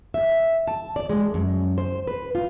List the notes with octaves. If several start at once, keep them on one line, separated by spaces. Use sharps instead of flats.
E5
A5
D5
G#3
F#2
C5
B4
F4